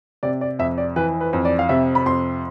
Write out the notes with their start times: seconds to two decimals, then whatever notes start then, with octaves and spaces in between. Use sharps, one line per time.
0.23 C3 D5
0.41 D5
0.59 F2 E5
0.78 D5
0.96 E3 B4
1.21 B4
1.33 F2
1.45 D5
1.59 F5
1.69 C3 E5
1.95 B5
2.06 F2 C6